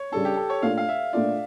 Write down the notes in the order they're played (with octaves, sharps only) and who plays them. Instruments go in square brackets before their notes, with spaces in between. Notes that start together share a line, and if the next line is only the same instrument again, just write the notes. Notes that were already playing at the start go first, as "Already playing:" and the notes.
Already playing: [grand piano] C#5
[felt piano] C#3 G3 D4 [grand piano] A4
[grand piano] G4
A4
C#5
[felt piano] A#2 A3 D4 F4 [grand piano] F5
[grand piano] F5
E5
[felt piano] A#2 A3 D4 F4 [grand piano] D5